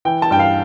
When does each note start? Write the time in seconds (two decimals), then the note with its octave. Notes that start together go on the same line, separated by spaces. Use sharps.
0.05 E3 G5
0.22 A5
0.31 G2 G5
0.39 F5